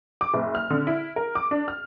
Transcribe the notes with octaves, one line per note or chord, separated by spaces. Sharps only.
D6
F#1
F6
D3
E4
A#4
D6
D4
F6